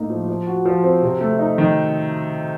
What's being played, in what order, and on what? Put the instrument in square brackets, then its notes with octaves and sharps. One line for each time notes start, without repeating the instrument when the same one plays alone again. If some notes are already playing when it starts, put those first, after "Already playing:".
Already playing: [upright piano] A2 A3 A#3 D#4
F3
F3
F#4
F3
C4
C3
A3
D#4
D#3